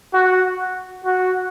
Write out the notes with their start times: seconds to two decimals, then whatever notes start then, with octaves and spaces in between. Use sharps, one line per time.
0.13 F#4
1.04 F#4